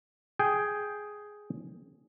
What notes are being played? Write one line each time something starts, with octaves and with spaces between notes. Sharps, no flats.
G#4 G5